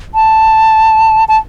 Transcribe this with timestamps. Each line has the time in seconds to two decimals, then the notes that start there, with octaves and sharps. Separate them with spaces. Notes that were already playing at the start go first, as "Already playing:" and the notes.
0.15 A5
1.28 A5